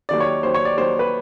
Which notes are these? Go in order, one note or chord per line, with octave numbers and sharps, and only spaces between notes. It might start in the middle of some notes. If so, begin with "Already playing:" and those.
D#2 D#3 F#3 D5
C#5
D#2 D#3 F#3 C5
C#5
D5
D#2 D#3 F#3 C5
B4